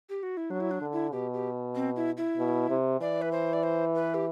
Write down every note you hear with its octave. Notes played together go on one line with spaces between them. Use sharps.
G4
F#4
E4
F#3 D4
E4
D4
D3
E4
B2 G4
G4
C4
E4
E4
B2
C3
E3 D5
B4
C5
D5
C5
B4
G4